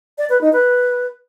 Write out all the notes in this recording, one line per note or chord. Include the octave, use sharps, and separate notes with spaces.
D5
B4
D#4
B4